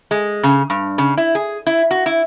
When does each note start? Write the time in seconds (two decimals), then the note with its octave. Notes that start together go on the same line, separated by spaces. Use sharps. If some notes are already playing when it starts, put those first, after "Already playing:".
0.11 G#3
0.43 C#3
0.70 G2
0.98 C#3
1.18 E4
1.35 G#4
1.67 E4
1.91 F#4
2.06 E4